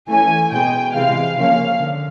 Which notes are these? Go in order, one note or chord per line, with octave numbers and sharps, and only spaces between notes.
E3 A3 C#4 G#5
B2 G#3 B3 G5
C3 E3 G#3 F5
C#3 F3 A#3 C#4 F5
D3